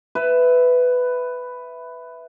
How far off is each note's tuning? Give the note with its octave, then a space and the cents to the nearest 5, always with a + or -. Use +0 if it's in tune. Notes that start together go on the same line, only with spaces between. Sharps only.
B4 +10 E5 +0